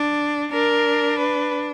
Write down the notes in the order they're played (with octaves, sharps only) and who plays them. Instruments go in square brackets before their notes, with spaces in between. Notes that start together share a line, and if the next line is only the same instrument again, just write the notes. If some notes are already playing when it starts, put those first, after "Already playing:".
Already playing: [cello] D4
[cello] D4 [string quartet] A#4
[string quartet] B4